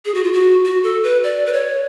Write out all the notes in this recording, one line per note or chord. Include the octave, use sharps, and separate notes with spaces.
G#4
F#4
F4
F#4
F#4
A4
B4
D5
B4
C#5